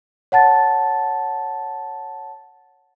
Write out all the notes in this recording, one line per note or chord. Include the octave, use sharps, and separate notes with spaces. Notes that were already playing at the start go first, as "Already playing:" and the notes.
C#5 F#5 A5 A6